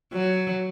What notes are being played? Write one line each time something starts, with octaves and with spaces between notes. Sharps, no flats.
F#3